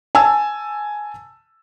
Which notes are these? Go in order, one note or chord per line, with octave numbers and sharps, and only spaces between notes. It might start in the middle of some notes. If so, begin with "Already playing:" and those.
G#5 A5 E6